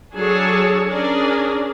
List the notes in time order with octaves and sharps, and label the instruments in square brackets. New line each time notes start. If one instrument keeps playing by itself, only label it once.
[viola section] F#3 D4 G#4 A4 C#5
C#4 D4 G#4 A#4 D5